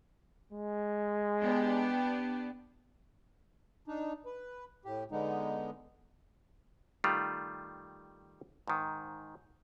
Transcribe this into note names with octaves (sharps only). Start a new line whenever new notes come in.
G#3
B3 D4 G4
D4 D#4
B4
A2 G4
D3 G#3 B3 D#4
D#3 G3 A3 F4
G#2 D#3